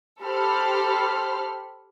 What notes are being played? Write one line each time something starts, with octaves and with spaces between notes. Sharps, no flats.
G4 A4 C5 B5 F6